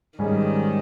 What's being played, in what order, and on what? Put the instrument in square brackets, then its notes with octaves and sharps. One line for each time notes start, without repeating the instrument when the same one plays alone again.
[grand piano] G#2 G3 C#4 G#4 [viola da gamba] D#3